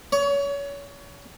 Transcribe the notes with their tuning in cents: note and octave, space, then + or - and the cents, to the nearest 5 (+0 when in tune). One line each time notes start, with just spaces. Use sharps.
C#5 +30